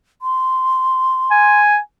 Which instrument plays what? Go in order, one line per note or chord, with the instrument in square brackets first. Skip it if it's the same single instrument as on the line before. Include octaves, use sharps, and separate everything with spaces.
[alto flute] C6
[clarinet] G#5